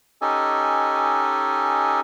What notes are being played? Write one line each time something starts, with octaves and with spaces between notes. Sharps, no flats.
C#4 D#4 G4 A4 D#5 G#5